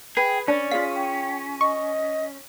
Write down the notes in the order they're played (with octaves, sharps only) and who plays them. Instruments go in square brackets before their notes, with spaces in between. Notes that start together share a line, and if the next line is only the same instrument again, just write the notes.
[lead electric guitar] G#4 [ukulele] B4 [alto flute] G5
[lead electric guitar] C#4 [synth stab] D4 [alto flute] D5
[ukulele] F4 G#4 F5 [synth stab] B6
[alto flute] G5
[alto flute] D#5 [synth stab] C#6